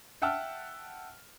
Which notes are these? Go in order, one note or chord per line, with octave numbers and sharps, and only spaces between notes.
E5 F#5 G5 A5 E6 F6